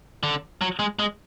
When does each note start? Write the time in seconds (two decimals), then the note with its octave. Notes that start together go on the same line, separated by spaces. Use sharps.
0.23 D3
0.61 F#3
0.79 G#3
0.99 G#3